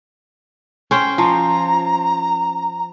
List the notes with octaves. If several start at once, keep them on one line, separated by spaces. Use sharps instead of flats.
C#4 C5 G5
F3 A#5